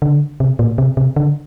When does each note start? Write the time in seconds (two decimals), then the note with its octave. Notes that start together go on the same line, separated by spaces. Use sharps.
0.02 D3
0.40 C3
0.59 A#2
0.78 C3
0.97 C3
1.16 D3